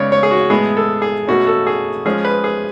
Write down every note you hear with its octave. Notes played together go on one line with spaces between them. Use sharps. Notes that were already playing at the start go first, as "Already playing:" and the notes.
Already playing: C#3 G#3 B3 C#5 D5
C#5
G#4
F#4
A2 G#3 B3 G#4
A4
G#4
B2 A3 C#4 F#4
A4
G#4
F3 G#3 C#4 G#4
B4
G#4